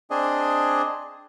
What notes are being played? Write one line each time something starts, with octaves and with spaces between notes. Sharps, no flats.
C4 D4 G#4 D#5